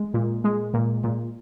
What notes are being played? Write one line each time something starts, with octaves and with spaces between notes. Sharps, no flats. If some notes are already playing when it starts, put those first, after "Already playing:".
Already playing: G#3
A#2
G#3
A#2
A#2